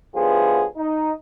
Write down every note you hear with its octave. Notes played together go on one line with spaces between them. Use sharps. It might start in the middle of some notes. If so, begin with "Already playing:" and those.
A2 D3 F3 G3 B3 G#4
D#4